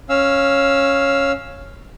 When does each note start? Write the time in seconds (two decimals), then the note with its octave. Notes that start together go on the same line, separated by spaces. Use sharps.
0.09 C#4 F5 E6